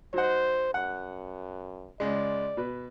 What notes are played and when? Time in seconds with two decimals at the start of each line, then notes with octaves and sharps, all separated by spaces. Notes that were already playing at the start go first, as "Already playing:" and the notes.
0.14 F#3 D#4 C5 F#5
0.74 F#2 F#5
2.00 C#2 G#3 D5
2.57 B2 B4